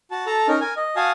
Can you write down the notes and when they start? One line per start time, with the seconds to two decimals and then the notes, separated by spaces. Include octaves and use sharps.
0.11 F#4 A5
0.26 A4 A5 A#5
0.48 C#4 D#4 A#4
0.61 A#4 G#5
0.77 D#5
0.96 F#4 F5 G#5 A5 D#6